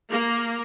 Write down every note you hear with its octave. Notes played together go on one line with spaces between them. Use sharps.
A#3